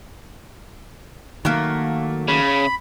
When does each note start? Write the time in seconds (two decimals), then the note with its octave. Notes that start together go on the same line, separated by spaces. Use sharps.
1.45 D#3 F#3 A3 A#3
2.28 C#3 B5